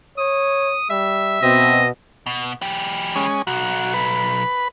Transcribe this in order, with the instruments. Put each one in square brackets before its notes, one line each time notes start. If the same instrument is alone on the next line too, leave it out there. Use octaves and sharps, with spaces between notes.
[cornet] C#5 [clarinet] D#6
[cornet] G3 [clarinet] E5
[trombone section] B2 [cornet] C4 [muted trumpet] D#5
[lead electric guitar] B2
E3 G4
[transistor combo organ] G#3 C#4
[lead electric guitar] B1 [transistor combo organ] F#4
[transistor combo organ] B4